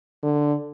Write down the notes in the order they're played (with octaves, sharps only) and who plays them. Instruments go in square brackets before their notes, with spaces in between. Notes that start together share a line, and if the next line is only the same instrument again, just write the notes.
[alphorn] D3